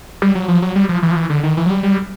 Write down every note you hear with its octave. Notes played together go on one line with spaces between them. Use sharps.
G3
F#3
F3
F#3
G3
F3
E3
F3
E3
D3
D#3
E3
F#3
G3
G3